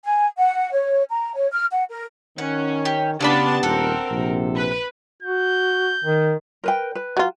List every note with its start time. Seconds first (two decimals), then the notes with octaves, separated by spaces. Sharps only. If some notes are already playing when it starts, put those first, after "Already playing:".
0.05 G#5
0.37 F#5
0.72 C#5
1.10 A#5
1.36 C#5
1.52 F6
1.71 F#5
1.90 A#4
2.38 D#3 C#4 F#5
2.85 G4
3.20 C#3 B3 D4 F4 G4 D5 A5 B5
3.63 D#1 C4 A4 A#4 F#5
4.11 A#1 C3
4.56 B4
5.23 F#4 G6
6.04 D#3
6.64 A#4 B4 G5
6.95 B4
7.17 F#3 F4